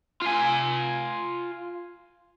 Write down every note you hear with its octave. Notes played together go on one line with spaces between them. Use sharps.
F4 G#5